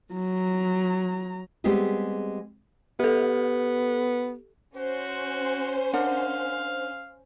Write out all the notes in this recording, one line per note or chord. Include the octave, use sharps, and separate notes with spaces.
F#3 A#5
G3 G#3 B3 C4 G4 G#4
B3 G4 A4
C#4 F#4 C5
D4 A#4 F5 F#5